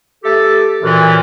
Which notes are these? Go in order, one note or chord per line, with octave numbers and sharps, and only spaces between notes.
A3 G4 A4
F#2 A#2 E3